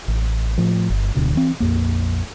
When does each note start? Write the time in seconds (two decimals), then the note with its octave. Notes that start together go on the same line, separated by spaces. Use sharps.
0.08 A1
0.58 A2 F3
0.90 G1
1.15 D1 D2 B2 D3
1.35 E3 C4
1.60 A#1 F2 A#3